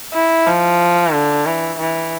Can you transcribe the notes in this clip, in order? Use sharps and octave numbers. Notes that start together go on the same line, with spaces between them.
E4
F3
D3
E3
E3